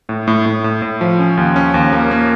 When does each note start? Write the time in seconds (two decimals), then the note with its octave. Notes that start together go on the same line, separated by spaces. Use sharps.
0.09 A2
0.27 A2
0.46 A2
0.64 A2
0.82 A2
1.01 F3
1.19 C#4
1.37 D#2
1.56 C#4
1.74 D#2
1.93 A#3
2.11 A#3